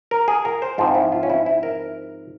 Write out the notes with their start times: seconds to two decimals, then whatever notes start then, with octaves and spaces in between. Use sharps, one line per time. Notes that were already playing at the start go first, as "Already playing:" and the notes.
0.11 A#4
0.28 G#4
0.45 A#4
0.62 C5
0.78 G#2 F3 C4 F4
0.95 E4
1.12 F4
1.23 C#4
1.30 E4
1.46 E4
1.63 A#4